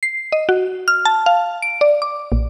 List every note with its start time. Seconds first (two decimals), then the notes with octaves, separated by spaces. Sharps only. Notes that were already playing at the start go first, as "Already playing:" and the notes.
0.03 C7
0.32 D#5
0.49 F#4
0.88 F6
1.05 A5
1.26 F5
1.62 D7
1.81 D5
2.02 D6
2.32 A#1